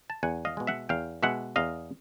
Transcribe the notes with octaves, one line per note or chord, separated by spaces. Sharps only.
A5
E2 F#5 G#5
D#5 F5
B2 G#3
E5 F#5
E2 F5 G5
B2 G#3 E5 F#5
E2 D#5 F5